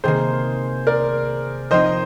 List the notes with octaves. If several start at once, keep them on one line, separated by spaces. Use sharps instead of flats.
C3 D#3 A#3 G#4 C5
A#4 D5
F3 C4 D#4 C5 D#5